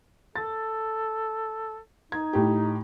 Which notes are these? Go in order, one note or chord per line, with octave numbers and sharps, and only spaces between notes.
A4 A6
D#4 G#6
A2 G4